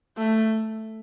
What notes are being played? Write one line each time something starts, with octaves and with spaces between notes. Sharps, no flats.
A3